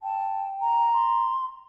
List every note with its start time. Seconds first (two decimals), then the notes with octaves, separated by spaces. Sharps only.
0.03 G5 A5
0.60 A#5
0.93 C6